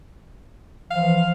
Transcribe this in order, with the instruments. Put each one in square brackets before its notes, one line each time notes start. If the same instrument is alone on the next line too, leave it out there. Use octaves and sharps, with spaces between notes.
[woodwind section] E3 F3 [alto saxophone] F5